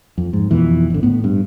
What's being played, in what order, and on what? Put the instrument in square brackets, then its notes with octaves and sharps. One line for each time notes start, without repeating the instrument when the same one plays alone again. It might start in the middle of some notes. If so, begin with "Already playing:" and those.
[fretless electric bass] F2
G#2
F2 B2 E3
G#1 D3
A2 B3
G2